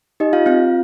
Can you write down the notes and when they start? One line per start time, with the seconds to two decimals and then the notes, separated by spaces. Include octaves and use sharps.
0.20 D#4 G4 D#5
0.33 F4 F5
0.46 C4 F4 F5